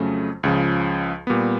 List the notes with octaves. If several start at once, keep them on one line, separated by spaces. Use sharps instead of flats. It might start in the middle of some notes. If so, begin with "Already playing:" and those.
Already playing: F2 C#3 F#3 A3 C#4
C#2 C#3 F3
A#2 G3 B3